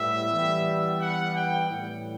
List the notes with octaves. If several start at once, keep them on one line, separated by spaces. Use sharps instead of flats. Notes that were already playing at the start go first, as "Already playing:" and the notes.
Already playing: A2 G3 B3 E5
E3 G3 B3
F#5
G5
A2 E3 G3